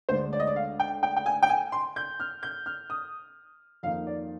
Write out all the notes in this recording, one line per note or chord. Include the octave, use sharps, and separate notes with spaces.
D2 D3 G#3 D4 C5
D5
D#5
D5
F5
G5
G5
G5
G#5
G5
G#5
C6
G6
F6
G6
F6
D#6
F2 D#3 A#3 D#4 F5
D5